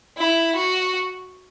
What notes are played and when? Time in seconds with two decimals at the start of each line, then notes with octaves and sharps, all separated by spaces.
0.18 E4
0.56 F#4